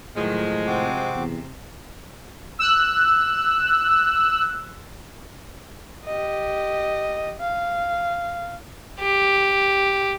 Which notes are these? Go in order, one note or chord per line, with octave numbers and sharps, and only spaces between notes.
A2 D#3 F3 F#3 G#3 F6
C3 C4 F#4 D6
E2
E6 F#6
G4 D#5
F5
G4